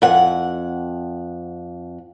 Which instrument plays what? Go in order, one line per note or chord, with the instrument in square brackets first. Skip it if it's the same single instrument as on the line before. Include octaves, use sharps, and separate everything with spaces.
[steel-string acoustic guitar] F2 F#5